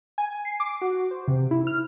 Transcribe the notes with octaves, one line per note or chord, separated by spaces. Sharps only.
G#5
C7
D6
F#4
C5
C3
E4
F6